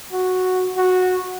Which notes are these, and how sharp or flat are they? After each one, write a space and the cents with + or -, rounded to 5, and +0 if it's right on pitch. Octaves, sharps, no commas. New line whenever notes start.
F#4 -5
F#4 -10